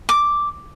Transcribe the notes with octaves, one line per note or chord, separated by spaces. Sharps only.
D6